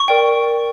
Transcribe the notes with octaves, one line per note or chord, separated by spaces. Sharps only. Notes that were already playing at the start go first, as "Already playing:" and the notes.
Already playing: C#6
A#4 D5 G5